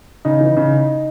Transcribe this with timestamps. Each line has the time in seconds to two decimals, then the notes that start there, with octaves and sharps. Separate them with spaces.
0.25 C#3 D#4
0.41 E3
0.57 C#3